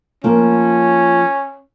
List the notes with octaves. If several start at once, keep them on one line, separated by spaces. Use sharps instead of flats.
F3 A#3 C#4